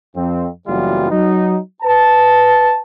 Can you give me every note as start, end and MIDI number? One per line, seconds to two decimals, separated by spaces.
0.15 0.47 41
0.15 0.47 60
0.68 1.10 30
0.68 1.10 52
0.68 1.10 54
0.68 1.10 55
0.68 1.10 59
0.68 1.10 65
1.11 1.57 54
1.11 1.57 63
1.83 2.80 71
1.83 2.80 81